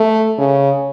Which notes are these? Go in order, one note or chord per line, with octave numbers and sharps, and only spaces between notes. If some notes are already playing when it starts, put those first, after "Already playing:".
Already playing: A3
C#3